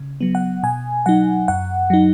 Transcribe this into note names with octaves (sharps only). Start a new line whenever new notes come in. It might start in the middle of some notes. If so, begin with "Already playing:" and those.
Already playing: C#3
F#3 B3
F#5
B2 G#5
F#3 D#4 F#5
F#2 F#5
F#3 D#4